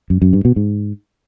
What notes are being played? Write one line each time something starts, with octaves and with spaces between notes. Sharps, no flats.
F#2
F#2
G2
B2
G#2